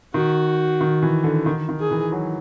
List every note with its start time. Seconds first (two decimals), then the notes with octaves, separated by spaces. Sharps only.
0.14 D#3 F#4
0.81 D#3
1.03 E3
1.24 D3
1.46 D#3
1.69 D#3
1.80 G#4
1.91 E3
2.12 F#3